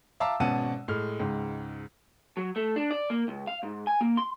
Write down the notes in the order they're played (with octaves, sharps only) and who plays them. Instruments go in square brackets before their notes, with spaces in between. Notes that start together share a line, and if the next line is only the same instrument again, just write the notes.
[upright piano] E5 F5 A5 A#5 D6 E6
G#1 B2 C#4 F#5 A5 D#7
A2 G#3 F6
C#2 G#2
[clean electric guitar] F#3
A3
D4
D5
A#3
C#2
F5
G#2
G#5
A#3
C6